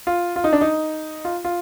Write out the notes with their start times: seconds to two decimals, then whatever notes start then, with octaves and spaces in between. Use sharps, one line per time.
0.07 F4
0.36 F4
0.44 D#4
0.53 D4
0.61 D#4
1.25 F4
1.45 F4